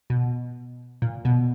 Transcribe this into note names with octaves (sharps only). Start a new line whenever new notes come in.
B2
A#2
B2